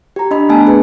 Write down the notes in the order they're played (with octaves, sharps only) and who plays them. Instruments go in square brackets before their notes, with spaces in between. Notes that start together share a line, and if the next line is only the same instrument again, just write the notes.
[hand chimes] G4 A#5
D4 D#5 B5
A3 B3 D4 G#5 A5
D4 G#4 B4